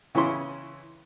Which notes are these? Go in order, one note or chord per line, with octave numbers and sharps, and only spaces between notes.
C#3 E3 C#4 E4 C6